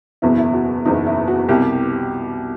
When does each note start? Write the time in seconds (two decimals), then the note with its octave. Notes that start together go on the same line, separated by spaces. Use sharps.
0.22 F#1 E2 B2 E4
0.38 E4
0.53 F#4
0.85 F#1 E2 B2 D#4
1.06 E4
1.28 F#4
1.49 C2 B2 G4